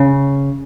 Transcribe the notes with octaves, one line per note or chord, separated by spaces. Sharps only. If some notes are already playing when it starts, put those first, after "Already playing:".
Already playing: C#3